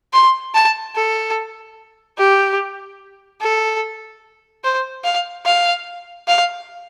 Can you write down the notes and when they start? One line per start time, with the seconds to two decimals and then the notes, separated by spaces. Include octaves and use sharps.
0.13 C6
0.55 A5
0.96 A4
2.18 G4
3.41 A4
4.64 C5
5.04 F5
5.46 F5
6.28 F5